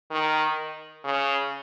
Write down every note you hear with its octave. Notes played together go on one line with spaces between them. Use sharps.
D#3
C#3